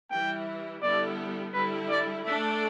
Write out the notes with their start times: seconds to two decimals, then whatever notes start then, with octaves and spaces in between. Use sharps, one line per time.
0.11 E3 G3 E4 G5
0.82 D3 G3 B3 E4 A4 D5
1.53 D3 G3 E4 B4
1.89 D5
2.25 A3 D4 A4 D5 E5